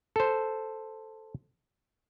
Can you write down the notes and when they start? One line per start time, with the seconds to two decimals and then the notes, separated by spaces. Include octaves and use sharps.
0.16 A4 C5